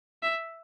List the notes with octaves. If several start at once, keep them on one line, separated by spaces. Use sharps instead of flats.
E5